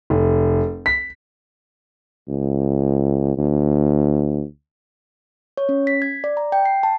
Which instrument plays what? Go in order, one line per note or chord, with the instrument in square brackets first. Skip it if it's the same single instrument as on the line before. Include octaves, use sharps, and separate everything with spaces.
[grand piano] F1
B6
[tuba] C#2
D2
[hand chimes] C#5
C#4
B6
G#6
D5
A#5
G5
C7
A5